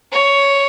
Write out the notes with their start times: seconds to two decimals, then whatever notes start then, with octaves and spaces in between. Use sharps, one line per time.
0.13 C#5